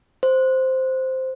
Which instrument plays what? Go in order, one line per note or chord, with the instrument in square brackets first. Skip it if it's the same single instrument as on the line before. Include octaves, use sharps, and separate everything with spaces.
[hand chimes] C5